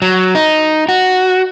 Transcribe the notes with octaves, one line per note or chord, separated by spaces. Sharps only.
F#3
D#4
F#4